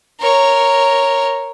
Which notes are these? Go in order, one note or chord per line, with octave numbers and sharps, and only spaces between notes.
A#4 C#5